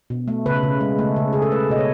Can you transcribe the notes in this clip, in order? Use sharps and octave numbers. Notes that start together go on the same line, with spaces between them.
B2
A3
C#3 B4
C#3
G#3
A3
C#3
C#3 G#4
A4
A3 B4
B2 D#5
C#5